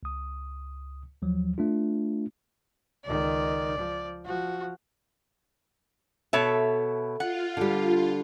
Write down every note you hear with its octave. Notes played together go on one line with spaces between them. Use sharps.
C#2 D#6
D#2 F3 F#3
A3 D4 F4
C#2 D#3 D5
F3
F3 F#4
B2 A4 C#5 E5
F4 F#5
D3 G3